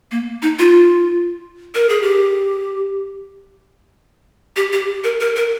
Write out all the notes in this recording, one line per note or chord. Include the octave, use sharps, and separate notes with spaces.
A#3
D#4
F4
A#4
G#4
G4
G4
G4
A#4
A#4
A#4